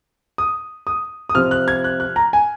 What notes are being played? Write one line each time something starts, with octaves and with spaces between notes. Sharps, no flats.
D#6
D#6
D#6
C3 F3 C4 F6
F#6
G#6
F#6
F#6
A#5
G#5